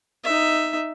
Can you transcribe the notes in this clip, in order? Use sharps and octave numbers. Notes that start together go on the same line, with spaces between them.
D#4 E5